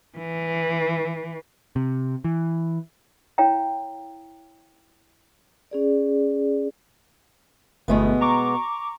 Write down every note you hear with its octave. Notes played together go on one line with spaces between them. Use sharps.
E3
C3
E3
E4 C#5 F5 G5 A#5
C#4 G#4 D5
G1 B2 G#3 A3 B3
A#5 C#6 D6